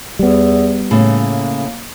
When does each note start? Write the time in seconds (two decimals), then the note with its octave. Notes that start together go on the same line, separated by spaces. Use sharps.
0.19 E2 G3 B3
0.91 A2 C#3 A#3